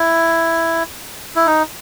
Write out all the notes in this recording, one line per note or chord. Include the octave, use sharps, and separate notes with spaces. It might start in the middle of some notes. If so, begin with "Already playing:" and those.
Already playing: E4
E4
D#4